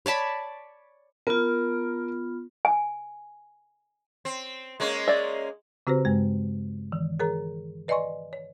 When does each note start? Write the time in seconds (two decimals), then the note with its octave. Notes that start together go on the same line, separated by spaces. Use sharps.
0.06 C#5 D5 A5 B5
1.27 B3 F4 A#4
2.65 G#5
4.25 C4
4.80 G#3 A#3 C#4
5.08 D5 E5
5.87 C#3 C4 F#4 G4 B4 C5
6.05 G2 G#3
6.92 D#3 E3
7.19 G#4 A#4 C#5 A#5
7.88 B4 D5 D#5 G#5 C6 C#6
8.33 C#5